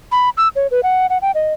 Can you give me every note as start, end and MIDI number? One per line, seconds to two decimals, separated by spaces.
0.12 0.29 83
0.37 0.48 88
0.56 0.67 73
0.71 0.80 71
0.83 1.07 78
1.10 1.18 78
1.22 1.31 79
1.35 1.53 75